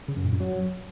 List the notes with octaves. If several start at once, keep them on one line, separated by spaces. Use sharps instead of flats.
C#3
F#2
A#2
F#2
F#3